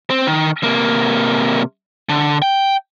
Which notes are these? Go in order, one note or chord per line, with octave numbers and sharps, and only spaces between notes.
C4
D#3
C3 A#3
D3
G5